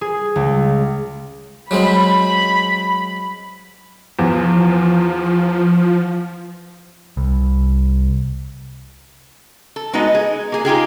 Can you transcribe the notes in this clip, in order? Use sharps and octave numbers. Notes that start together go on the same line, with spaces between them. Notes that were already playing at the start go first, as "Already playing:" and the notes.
G#4
C#2
F#3 G#3 C4 B5
E2 F3
C2
A4
G#3 B3 D#4 F#4 B4 D#5
G#4
A#3 G#4
D#4 F4 G4 G#4